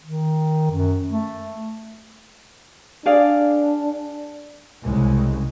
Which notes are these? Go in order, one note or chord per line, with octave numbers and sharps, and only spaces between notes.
D#3
F#2
A3
D4 G#4 D5 F5
C2 C#3 G#3